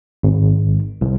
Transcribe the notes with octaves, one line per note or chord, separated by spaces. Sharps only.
G#1
C2